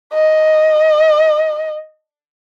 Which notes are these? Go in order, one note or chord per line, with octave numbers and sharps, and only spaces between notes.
D#5